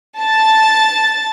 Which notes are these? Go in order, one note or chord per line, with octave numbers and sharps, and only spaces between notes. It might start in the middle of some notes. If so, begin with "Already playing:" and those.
A5 A6